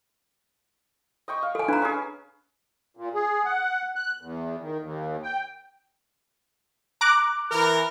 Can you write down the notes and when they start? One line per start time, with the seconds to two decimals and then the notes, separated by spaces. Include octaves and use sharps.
1.28 D#5 G5 C#6
1.43 F5
1.55 A4 G#5
1.68 D4 B4 A#5
1.82 C#4 G#4
2.97 A#2
3.15 G#4
3.45 F#5
3.96 F#6
4.21 E2
4.61 D#3
4.80 D#2
5.23 G5
7.01 A#5 D6 F#6
7.52 E3 A#4